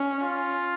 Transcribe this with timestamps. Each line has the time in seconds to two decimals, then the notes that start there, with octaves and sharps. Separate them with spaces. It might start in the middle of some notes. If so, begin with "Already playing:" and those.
Already playing: C#4
0.22 F4